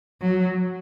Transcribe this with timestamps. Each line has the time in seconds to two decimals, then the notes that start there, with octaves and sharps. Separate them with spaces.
0.22 F#3